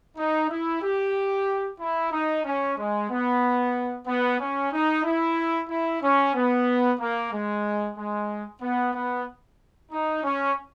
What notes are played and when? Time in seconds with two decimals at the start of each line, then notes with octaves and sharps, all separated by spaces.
0.17 D#4
0.50 E4
0.83 G4
1.80 E4
2.12 D#4
2.44 C#4
2.77 G#3
3.10 B3
4.07 B3
4.40 C#4
4.72 D#4
5.04 E4
5.69 E4
6.02 C#4
6.35 B3
7.00 A#3
7.32 G#3
7.97 G#3
8.62 B3
8.94 B3
9.92 D#4
10.24 C#4